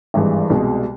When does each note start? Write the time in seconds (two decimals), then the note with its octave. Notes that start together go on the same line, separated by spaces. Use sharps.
0.14 G#1 G2 E3 G#3
0.50 C2 B2 G#3